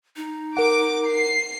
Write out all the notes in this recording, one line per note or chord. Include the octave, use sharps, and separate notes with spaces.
D#4
A#4 F#5 D6
C7